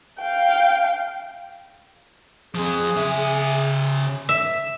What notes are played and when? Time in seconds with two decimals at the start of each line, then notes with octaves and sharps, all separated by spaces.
0.21 F5 G5
2.55 F3 C4 G#4
2.97 C#3 E5
4.29 E5